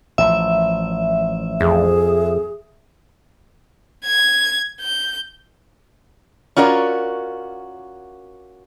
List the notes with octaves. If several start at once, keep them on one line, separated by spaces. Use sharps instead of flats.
A1 F3 E5
F2 G#4
G#6
G6
C#4 F4 F#4 A#4 D5